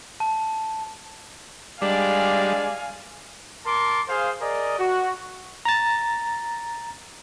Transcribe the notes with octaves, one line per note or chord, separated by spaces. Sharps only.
A5
G3 G#3 D4 D5 F5 G#5
A#4 A5 C6 D6
G#4 C5 F5
G#4 A#4 D5 D#5
F#4
A#5 A6